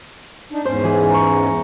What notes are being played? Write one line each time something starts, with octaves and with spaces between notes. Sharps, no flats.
D4 D#4
E2 G#2 C#4 C5
E3 G#4
A#5 C#6